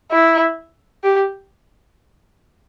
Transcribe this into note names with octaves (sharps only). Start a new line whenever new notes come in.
E4
G4